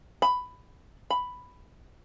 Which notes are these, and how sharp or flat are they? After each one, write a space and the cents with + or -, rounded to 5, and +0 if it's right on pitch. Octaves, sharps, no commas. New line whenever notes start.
B5 +10
B5 +5